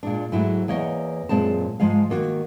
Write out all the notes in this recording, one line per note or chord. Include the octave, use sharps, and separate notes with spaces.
A#2 G#3 D4
G#2 F#3 A3 E4
E2 A#3 C#5 D#5 F#5
F#2 A#2 G#3 C4 A5
G#2 F3 G#3 F5
D#3 A#3 F#4